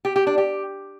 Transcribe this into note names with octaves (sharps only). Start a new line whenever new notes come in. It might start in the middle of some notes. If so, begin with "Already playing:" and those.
G4
G4
D4
G4